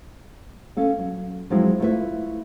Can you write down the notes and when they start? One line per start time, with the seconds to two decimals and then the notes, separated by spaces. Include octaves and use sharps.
0.77 C#4 A4 F5
0.98 F#3
1.50 F3 F#3 G#3 C4 E4
1.80 A3 E4 F4 G#4 B4 E5